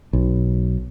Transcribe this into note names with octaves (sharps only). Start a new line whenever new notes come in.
B1